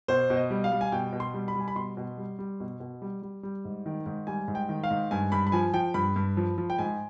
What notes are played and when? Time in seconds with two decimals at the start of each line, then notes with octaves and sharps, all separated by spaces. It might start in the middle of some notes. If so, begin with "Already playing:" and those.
0.08 B2 C5
0.30 B2
0.36 D#5
0.50 G3
0.64 F5
0.72 G3
0.81 G#5
0.92 B2 G5
1.13 B2
1.20 C6
1.34 G3
1.48 B5
1.55 G3 G#5
1.68 B5
1.75 B2 C6
1.97 B2
2.18 G3
2.39 G3
2.60 B2
2.80 B2
3.02 G3
3.22 G3
3.43 G3
3.65 G#2
3.86 D#3
4.06 G#2
4.27 G3 G#5
4.48 G#2
4.55 G5
4.69 D#3
4.84 F5
4.90 G#2
5.11 G2 G#5
5.32 G2 B5
5.47 B5
5.52 F3 G#5
5.73 F3 G5
5.94 G2 B5
6.16 G2
6.37 F3
6.58 F3
6.70 G5
6.78 G#2 G#5